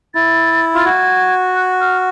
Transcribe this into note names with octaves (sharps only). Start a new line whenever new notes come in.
E4 A6
F4 A6
F#4 G#6
F#6
F6